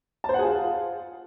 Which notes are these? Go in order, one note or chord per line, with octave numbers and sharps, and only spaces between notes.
A5
C5
F#5
G#4
F4